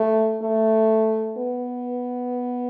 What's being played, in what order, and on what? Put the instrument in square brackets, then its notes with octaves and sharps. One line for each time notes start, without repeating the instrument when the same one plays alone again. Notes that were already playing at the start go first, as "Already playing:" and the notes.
Already playing: [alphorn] A3
A3
B3